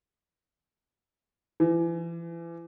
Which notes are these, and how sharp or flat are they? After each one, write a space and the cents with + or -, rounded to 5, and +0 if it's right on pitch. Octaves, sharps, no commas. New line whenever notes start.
E3 +35